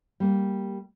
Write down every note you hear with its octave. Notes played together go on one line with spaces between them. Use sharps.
G3 A#3